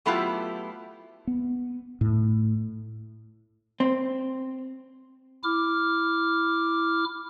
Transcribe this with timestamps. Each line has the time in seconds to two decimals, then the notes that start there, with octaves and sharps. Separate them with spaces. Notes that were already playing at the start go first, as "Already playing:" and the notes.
0.06 F#3 A3 B3 E4 F4 G4
1.27 B3
2.01 A2
3.80 C4
5.43 E4 D6 F6